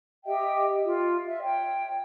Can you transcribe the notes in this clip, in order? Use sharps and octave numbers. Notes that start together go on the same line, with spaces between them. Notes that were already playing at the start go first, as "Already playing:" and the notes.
G4 D#5 E5 G5
F4
E5
C#5 G5